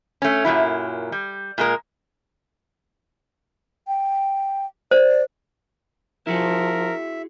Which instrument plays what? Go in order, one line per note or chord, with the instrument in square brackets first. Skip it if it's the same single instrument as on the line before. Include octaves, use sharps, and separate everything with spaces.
[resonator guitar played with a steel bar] A3 C#4
F#2 A#2 F#3 E4
G3
A#2 G#3 A#4
[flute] G5
[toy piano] C5 [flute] D5
[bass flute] F3 [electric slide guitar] E4 F#4 G#4 [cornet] A#4 [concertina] E5